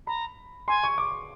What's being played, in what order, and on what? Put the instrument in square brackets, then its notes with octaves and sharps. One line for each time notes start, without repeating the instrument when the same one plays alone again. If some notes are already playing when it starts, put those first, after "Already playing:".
[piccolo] A#5 [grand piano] B5
[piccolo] G#5 [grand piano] C6
[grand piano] C#6
D6